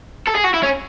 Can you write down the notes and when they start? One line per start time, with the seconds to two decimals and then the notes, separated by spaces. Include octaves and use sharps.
0.27 A4
0.35 G#4
0.44 F#4
0.54 E4
0.63 C#4